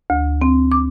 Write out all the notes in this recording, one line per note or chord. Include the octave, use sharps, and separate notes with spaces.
D2
C4
D6